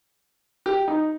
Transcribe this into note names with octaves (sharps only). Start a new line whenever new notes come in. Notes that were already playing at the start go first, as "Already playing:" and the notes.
G4
D#4